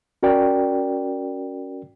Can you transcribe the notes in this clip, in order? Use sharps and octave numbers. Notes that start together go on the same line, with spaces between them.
C#4 F#4 A#4 D5 G5